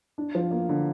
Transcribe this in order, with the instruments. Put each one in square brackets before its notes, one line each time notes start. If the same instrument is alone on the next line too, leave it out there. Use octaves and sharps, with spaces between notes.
[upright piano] D4
F3
A#3
D3